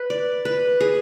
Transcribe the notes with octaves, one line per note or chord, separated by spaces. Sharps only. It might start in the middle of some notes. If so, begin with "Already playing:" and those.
Already playing: B4
D5
B4
G#4